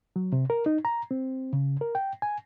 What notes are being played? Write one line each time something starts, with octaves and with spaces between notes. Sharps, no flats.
F#3
C3
A#4
D#4
A#5
C4
C#3
A#4
G5
G#5